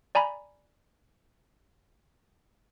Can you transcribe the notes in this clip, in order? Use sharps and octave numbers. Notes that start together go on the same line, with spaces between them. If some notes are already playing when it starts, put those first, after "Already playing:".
D5 G#5 A#5 B5